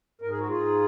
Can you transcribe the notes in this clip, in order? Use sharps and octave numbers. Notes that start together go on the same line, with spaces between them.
G#2 A#4
G#4
F#4
G#2 F4 G#4